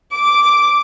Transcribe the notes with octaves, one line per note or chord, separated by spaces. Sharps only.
D6